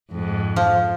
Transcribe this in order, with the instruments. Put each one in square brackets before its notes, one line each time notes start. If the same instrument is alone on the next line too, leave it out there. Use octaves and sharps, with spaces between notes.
[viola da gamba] F2 G#2
[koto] F3